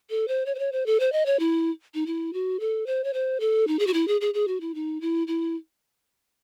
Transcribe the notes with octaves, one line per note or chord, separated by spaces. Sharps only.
A4
C5
C#5
C5
C#5
C5
A4
C5
D#5
C#5
E4
D#4
E4
F#4
A4
C5
C#5
C5
A4
D#4
G#4
F#4
E4
G#4
G#4
G#4
F#4
E4
D#4
E4
E4